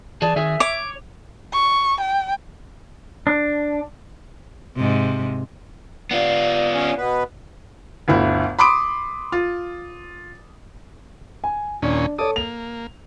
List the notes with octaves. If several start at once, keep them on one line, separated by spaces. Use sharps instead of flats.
E3 G#4 D5 A5
D#3 G#4 E5 G#5
C#5 D6
C#6
G5
D4
G#2 C3
B3 F4 D5
C#4
B2 B3 B4
G1 D2 E4
B5 C6 D6 D#6 D7
F4
G#5
D#2 A#2 C#4 D4
A4 C#5 D5 D#6
A#3 F7